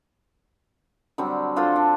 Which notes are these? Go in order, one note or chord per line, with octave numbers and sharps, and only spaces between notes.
D3 F#3 G3 C4
D4 F4 A4 C5
D4